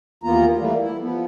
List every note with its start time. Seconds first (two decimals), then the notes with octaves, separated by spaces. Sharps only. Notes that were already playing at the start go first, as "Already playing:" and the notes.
0.23 D#2 E3 A#3 B3 F4 A#5
0.57 E3 G3 A3 A#3
0.79 E4
1.00 F3 B3